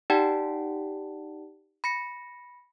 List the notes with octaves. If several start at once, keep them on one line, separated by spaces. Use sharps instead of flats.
D#4 G4 D5 F#5 G5 A5
B5 A#6 C#7